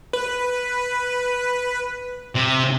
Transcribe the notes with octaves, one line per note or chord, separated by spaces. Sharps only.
B4
C3